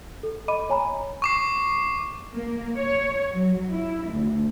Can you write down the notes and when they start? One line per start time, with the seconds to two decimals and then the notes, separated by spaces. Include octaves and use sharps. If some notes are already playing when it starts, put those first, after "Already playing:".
0.23 A4
0.48 D#5 B5 D6 D#7
0.70 C#5 G#5 A#5 B5
1.22 C#6 D6 C7
2.33 A#3
2.77 C#5
3.33 F#3
3.71 E4
4.11 D2